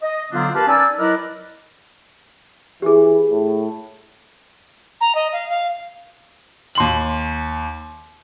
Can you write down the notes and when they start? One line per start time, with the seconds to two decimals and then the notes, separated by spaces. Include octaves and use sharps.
0.02 D#5
0.32 D3 F#3 B3 C4 D4 F4
0.54 G4 A#4 B4 D#5 F5 A5
0.68 C#4 D#4 D5 G#5 A5 E6
0.98 F#3 E4 A#4 B4 D5 D#5
2.82 E3 G4 G#4
3.31 A2
5.01 A#5
5.15 D#5
5.33 F5
5.50 F5
6.75 D#2 C6 F#7